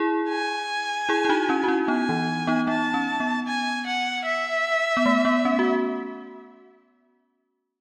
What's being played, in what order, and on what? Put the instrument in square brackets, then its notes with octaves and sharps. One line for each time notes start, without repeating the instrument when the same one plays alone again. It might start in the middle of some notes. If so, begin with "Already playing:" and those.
Already playing: [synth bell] E4 G#4
[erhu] G#5
[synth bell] E4 G#4
E4
D#4 F#4
C#4 E4
F#4
C#4 E4
[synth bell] B3 D#4 [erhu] G#5
[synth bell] E3
B3 D#4
[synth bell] B3 D#4 [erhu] A5
[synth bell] C#4
B3
[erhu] G#5
F#5
E5
[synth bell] B3
A3
B3
C#4
F#4